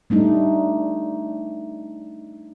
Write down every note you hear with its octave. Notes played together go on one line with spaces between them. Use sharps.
G3 A3 D4 D#4